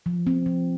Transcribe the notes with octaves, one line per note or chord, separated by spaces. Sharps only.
F3
C4
F3